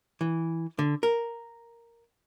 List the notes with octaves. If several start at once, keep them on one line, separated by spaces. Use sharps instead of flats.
E3
D3
A#4